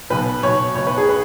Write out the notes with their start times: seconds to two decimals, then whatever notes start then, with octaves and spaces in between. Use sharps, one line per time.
0.10 B1 B2 B4
0.43 B1 B2 C#5
0.76 B1 B2 C#5
0.87 B4
0.98 G#4
1.09 B4